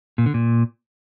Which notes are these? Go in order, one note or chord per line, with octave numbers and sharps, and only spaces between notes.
A#2
D3
A#2